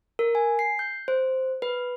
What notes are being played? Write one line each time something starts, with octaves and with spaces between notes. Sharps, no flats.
A#4
G#5
C7
G6
C5
B4